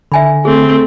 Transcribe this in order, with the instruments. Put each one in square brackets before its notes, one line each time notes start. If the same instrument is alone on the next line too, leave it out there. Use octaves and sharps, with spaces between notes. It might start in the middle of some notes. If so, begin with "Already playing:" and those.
[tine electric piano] D3 [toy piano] E5 G#5 B5
[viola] A3 C4 [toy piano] G#4